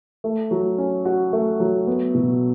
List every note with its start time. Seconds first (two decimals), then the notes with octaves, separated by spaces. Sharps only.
0.24 A3
0.51 F#3
0.78 C#4
1.05 F#4
1.33 A3
1.60 F#3
1.87 B3
2.15 B2